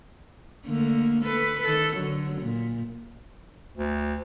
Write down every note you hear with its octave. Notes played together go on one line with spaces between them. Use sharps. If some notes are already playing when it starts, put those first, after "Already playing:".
D3 A3 A#3
A4 B4
D#3 A4
D3 F#3
A#2
D2